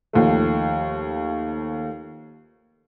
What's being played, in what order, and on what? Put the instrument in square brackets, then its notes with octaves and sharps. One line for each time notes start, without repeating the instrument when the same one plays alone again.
[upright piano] D#2 F3 A3